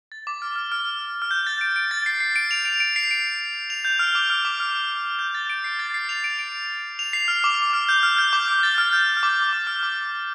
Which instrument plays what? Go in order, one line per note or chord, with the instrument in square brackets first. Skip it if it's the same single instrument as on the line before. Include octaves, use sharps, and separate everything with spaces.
[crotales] A6
D6
F6
F6
F6
F6
G6
A6
D7
D7
A6
C7
C7
D7
F7
D7
D7
C7
D7
F7
G6
F6
D6
F6
D6
F6
G6
A6
D7
C7
A6
C7
F7
D7
D7
F7
C7
F6
D6
F6
G6
F6
G6
D6
F6
A6
F6
G6
F6
D6
D6
F6
D6